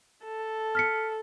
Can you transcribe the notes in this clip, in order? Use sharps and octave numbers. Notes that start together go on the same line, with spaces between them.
A4
F6 B6 C#7